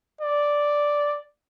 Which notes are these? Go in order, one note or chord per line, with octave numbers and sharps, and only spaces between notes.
D5